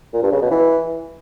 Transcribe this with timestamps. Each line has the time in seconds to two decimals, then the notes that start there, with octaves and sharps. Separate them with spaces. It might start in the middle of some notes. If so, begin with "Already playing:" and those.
0.13 A#2
0.23 G2
0.32 C#3
0.41 B2
0.51 E3